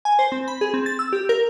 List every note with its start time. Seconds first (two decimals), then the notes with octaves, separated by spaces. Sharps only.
0.05 G#5
0.19 C5
0.32 C4
0.48 B5
0.61 G#4
0.74 C4
0.86 A6
0.99 E6
1.13 G4
1.29 A#4